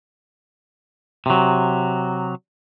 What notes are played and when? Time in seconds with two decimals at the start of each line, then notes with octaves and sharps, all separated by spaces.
1.26 C3 F#3